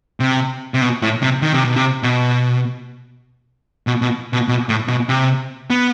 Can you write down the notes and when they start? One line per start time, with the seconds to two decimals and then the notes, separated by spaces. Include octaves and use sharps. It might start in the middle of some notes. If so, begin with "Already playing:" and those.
0.20 C3
0.74 C3
0.81 B2
1.02 A2
1.22 C3
1.42 D#3
1.53 C3
1.65 B2
1.76 C3
2.03 B2
3.87 B2
4.02 B2
4.33 B2
4.48 B2
4.69 A2
4.88 B2
5.09 C3
5.70 B3